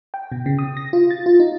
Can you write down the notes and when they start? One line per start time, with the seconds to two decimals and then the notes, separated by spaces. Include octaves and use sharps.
0.14 G5
0.32 B2
0.46 C#3
0.59 D#6
0.77 A#6
0.93 F4
1.10 A6
1.26 F4
1.40 D#4